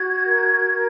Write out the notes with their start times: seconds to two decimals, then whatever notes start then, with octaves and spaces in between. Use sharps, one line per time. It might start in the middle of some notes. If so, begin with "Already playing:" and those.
Already playing: F#4 G#6
0.26 A#4
0.72 A#4